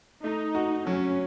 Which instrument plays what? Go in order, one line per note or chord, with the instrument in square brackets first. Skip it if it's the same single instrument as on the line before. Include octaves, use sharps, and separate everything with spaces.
[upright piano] A3 [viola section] D#4
[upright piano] F#4
[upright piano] F#3 [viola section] C#4